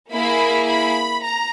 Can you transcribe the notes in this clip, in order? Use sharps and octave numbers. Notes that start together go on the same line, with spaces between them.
A#3 E4 G#4 B5
B5
A#5